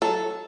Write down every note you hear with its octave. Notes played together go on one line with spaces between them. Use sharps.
F#3 A4